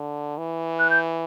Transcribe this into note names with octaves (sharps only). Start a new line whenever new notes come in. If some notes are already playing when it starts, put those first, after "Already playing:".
Already playing: D3
E3
F#6
G6